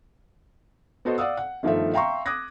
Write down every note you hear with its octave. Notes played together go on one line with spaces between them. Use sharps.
B3 F#4 A4 C5 D#5
D5 F5 F#5 D#6 E6
F#5
G1 D#3 F3 A3 E5
E5 F5 G5 A#5 C6 C#6
D6 D#6 F#6 G#6 A#6